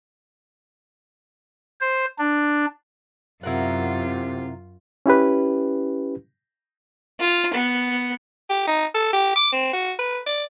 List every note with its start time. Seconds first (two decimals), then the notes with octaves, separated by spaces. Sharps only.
1.81 C5
2.18 D4
3.43 F#2 C3 E4 F4 A#4 F#5
5.06 C#4 E4 G4 B4
7.20 F4
7.53 B3
8.50 G4
8.67 D#4
8.95 A4
9.13 G4
9.36 D6
9.53 C4
9.73 F#4
9.99 B4
10.26 D5